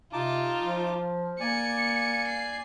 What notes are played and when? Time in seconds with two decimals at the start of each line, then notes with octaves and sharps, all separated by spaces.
0.13 C3 D#4 F4 A5 D6
0.61 F3
1.40 A#3 D5 G#5 C#7
2.27 C7